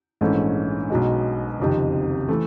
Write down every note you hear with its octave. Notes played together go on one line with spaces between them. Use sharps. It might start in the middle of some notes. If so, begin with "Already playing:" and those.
A#1 G#2 E3 A3 C#4
B1 B2 G#3
F#1 F2 C3 D#3
E3 A3